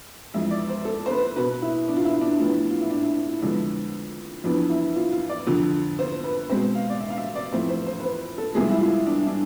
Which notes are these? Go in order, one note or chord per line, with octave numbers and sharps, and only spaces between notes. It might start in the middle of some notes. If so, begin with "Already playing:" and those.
F2 E3 G#3 E5
D5
C5
A4
C5
B4
B2 B3 B4
E4
D4
F4
E4
D4
A2 F3 B3
F4
E4
D4
E4
D4
E4
F2 D3 G#3 B3 D4
F2 E3 B3 D4
E4
F4
F4
D5
F2 D3 F3
C5
B4
B2 G#3 C4 C5
F5
D5
E5
F5
E5
D5
F2 E3 A3 C4 C5
C5
C5
B4
C5
A4
C2 C3 F3 G#3 G#4
E4
F4
D4
D4